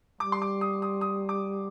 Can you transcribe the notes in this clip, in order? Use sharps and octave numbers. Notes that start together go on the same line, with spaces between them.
G3 D6
C6
D6
D#6
D#6
D#6
D6